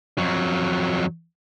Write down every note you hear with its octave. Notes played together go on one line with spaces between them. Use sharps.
F2 F#3